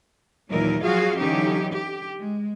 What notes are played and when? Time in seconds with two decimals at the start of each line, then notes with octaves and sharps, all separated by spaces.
0.49 D#2 A#2 E3 F#3 D#4 A#4
0.82 F3 F#3 F4 F#4 G#4 F5
1.17 D3 E3 F#3 C#4 D#4 G4
1.72 G4
2.17 G#3